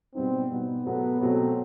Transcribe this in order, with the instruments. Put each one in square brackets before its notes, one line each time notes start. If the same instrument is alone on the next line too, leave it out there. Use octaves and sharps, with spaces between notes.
[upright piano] B2 G3 B3 D#4 [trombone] C4
[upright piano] B2 G3 B3 D#4
[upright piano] B2 F#3 A3 [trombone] B3
[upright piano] B2 F#3 A3 [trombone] C4